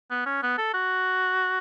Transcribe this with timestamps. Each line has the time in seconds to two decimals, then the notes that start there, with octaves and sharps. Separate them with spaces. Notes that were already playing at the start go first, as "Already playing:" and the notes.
0.11 B3
0.26 C#4
0.42 B3
0.58 A4
0.74 F#4